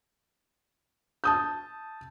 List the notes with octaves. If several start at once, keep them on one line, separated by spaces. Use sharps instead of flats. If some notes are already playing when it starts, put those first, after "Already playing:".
A5 D#6 G6